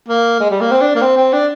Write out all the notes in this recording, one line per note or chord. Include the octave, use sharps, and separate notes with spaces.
A#3
G#3
G3
A#3
C4
D4
A#3
C4
C4
D4